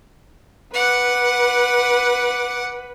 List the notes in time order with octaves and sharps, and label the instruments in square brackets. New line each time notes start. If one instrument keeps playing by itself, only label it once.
[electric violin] B4 [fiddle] F#5 D6